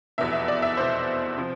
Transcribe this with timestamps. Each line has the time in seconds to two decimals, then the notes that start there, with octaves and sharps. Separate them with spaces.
0.18 F1 E2 B2 E5
0.33 E5
0.48 D5
0.62 E5
0.76 F1 E2 B2 C5
1.38 C3 F3